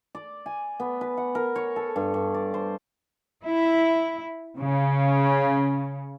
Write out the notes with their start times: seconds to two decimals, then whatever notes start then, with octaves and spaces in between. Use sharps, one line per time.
0.15 D5
0.46 G#5
0.80 B3
1.01 B4
1.17 F#5
1.35 A#4
1.56 C#5
1.76 A4
1.96 G2
2.14 G2
2.34 D5
2.54 C5
3.45 E4
4.59 C#3